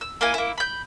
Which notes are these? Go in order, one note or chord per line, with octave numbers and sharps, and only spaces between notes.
E6
A#3 E4 G#5
A#3 E4
B5 G6